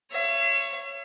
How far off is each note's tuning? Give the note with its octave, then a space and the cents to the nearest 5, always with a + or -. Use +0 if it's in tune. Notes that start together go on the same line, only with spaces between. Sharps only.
C#5 +0 E5 +45